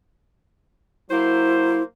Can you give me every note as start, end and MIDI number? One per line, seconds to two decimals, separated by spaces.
1.10 1.81 54
1.10 1.81 58
1.10 1.83 64
1.10 1.81 72